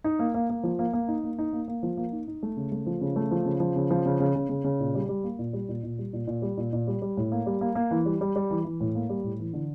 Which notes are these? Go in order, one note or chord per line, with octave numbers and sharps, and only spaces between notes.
D#4
A#3
A#3
A#3
F3
A#3
A#3
D#4
A#3
D#4
A#3
A#3
F3
A#3
D#4
D#4
A3
C#3
A3
F3
C#3
A3
F3
C#3
F3
C#3
F3
C#3
C#3
C#3
C#3
C#3
A#2
G3
G3
A#3
A#2
G3
A#2
A#2
G3
A#2
A#2
G3
A#2
A#2
G3
G3
A2
A#3
G3
A#3
A#3
E3
G3
G3
G3
E3
E3
A2
A#3
G3
A2
E3
D3